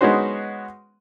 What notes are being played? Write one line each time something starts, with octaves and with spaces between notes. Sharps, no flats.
G#3 B3 C#4 D#4 F#4 C5